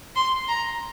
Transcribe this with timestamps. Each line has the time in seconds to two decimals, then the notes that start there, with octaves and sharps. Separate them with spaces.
0.16 C6
0.48 A#5